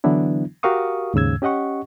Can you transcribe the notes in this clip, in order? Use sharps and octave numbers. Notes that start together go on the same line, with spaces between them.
D3 E3 F#3 B3 D4 E4
F#4 G4 A#4 F5 C#6 D#6
D#2 G#2 C#3 E6 G#6
C#4 G4 D#5 F#5 C#6